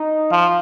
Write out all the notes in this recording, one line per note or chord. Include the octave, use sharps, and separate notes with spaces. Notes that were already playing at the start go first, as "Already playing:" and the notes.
Already playing: D#4
F3 F4